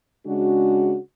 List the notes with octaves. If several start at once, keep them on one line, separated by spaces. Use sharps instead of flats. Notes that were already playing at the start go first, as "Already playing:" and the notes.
C#3 G#3 D4 F#4